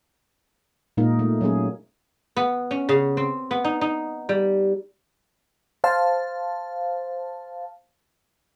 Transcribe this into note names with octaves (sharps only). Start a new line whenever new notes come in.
A#2 G#3 A#3 D#4 A#4
A3
F#3 A#3 C#4 G#4
B3
C#4
C#3
C4
B3
D#4
D#4
G3
C5 F5 A5